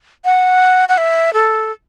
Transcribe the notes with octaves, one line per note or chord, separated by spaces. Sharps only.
F#5
F#5
E5
A4